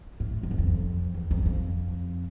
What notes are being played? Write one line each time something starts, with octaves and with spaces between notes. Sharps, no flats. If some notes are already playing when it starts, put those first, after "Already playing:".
A2
F2
E2
F2
E2
F2
F2